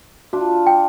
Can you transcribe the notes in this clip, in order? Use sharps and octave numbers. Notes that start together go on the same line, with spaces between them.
D4 F4 F#4
G5